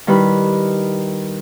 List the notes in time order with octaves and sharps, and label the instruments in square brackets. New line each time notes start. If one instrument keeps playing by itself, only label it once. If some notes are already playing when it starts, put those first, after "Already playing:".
[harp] D#3 G3 E4 B4 B5